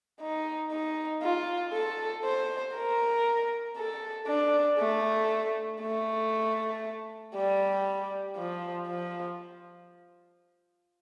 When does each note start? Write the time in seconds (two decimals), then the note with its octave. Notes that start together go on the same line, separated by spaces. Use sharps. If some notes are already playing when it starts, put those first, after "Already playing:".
0.21 D#4
0.72 D#4
1.23 F4
1.73 A4
2.25 C5
2.75 A#4
3.78 A4
4.28 D4
4.79 A3
5.82 A3
7.35 G3
8.37 F3
8.88 F3